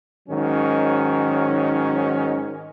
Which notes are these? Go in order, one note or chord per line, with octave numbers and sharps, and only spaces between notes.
G#2 D#3 F#3 C#4